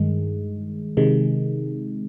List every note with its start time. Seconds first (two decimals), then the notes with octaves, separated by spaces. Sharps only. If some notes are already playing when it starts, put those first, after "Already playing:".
Already playing: G2 D#3 G#3
0.97 C3 D#3 G#3